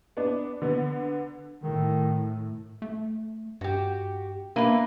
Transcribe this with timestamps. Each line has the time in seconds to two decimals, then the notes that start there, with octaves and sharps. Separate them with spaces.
0.17 B3 D4
0.62 D3 B3
1.63 A2 D#3
2.82 A3
3.61 G2 F#4 G4
4.56 A#3 D4 E4 B4